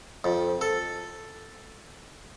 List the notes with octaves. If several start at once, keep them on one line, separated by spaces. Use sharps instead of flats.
F2
A4